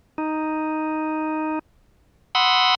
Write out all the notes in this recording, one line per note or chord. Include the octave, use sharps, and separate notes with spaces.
D#4
F#5 B5 C6 D#6 E6